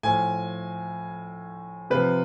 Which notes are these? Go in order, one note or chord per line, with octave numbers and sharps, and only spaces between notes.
A2 F3 G#5
C3 F3 B4